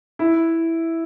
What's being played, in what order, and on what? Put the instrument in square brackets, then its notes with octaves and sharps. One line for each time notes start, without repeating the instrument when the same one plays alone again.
[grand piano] E4